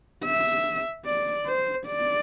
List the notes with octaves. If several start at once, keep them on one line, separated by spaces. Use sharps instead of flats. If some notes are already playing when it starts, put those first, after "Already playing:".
E5
D5
C5
D5